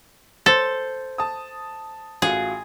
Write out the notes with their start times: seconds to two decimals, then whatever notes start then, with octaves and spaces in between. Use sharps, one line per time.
0.46 A4 C5 A6
1.18 A5 D#6
2.22 A1 F4 F#4 G#4